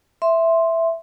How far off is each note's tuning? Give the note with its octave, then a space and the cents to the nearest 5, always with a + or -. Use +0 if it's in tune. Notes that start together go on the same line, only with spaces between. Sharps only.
E5 +0 C6 +5